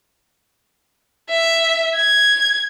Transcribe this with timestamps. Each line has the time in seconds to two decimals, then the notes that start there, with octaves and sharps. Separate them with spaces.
1.30 E5
1.96 G#6